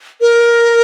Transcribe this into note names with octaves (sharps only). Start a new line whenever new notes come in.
A#4